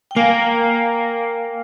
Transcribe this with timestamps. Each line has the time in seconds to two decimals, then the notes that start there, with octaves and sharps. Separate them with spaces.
0.11 G5
0.16 A#3 F5 G#5